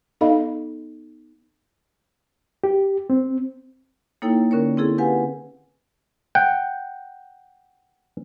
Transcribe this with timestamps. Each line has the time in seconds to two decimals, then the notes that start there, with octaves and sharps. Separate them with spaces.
0.21 B3 D#4 A4 D#5 F5 B5
2.64 G4
3.10 C4
4.22 A#3 D#4 E4 A4 C#5 G5
4.51 D3 C#4 A#4 C#5
4.77 C4 E4 G#4 A4
4.98 G4 B4 F5 F#5 G#5
6.35 F#5 G5